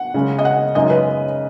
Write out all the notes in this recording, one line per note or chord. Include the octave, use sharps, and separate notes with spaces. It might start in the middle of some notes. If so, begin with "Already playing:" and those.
Already playing: F#5
C#3 G#3 C#4
D#5
F#5
F#2 C#3 G#3 D#4 D#5
B4